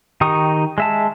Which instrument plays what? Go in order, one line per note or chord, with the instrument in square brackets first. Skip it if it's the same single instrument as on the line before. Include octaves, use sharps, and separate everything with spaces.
[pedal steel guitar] D#3 D#4 G4 C#6 D#6
G#3 E5 A5